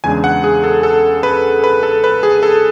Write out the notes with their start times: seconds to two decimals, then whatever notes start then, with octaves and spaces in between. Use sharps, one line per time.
0.04 E2 C#3 G#3 D4 G#5
0.24 F#5
0.44 G#4
0.64 A4
0.83 A4
1.23 B4
1.64 B4
1.83 A4
2.04 B4
2.23 G#4
2.43 A4